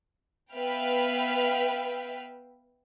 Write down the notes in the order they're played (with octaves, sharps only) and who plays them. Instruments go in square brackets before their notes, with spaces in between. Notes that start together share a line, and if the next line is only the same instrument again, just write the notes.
[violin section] B3 B4 E5 F5 G5 F6